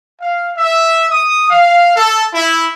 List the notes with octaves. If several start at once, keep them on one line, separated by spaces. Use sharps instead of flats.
F5
E5
D#6
F5
A4
E4